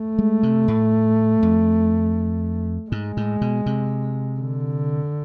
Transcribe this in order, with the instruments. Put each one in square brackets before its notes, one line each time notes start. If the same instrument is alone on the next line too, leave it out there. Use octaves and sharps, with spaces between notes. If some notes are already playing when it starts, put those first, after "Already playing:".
Already playing: [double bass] A3
[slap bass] G#3
C3
A2
F2
[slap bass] G#2 [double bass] G#3
[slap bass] A2
B2
C3
[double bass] D3